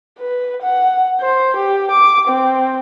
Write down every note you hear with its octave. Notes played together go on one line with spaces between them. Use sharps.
B4
F#5
C5
G4
D6
C4